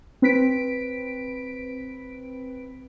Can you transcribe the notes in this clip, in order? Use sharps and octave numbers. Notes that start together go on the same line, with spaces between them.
C4 B4 B6 D7